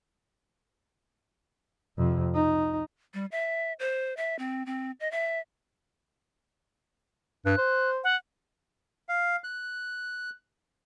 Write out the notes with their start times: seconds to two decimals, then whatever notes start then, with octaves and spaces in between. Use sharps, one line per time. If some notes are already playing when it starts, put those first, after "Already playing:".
1.98 F2 C3
2.34 D#4
3.14 G3
3.32 E5
3.79 C5
4.17 E5
4.39 C4
4.66 C4
5.00 D#5
5.11 E5
7.46 G2 F#6
7.58 C5
8.04 F#5
9.09 F5
9.44 F#6